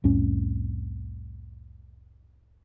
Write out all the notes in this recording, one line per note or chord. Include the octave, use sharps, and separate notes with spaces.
C2 F2 A2 C#4